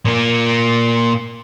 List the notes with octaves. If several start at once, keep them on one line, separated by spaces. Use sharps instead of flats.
A#2 A#3